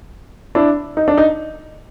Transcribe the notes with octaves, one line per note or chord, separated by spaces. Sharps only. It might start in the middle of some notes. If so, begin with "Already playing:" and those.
D4 E4
D#4
D4
D#4